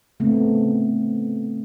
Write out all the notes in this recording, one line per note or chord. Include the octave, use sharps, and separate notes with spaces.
C#3 A3 B3 C4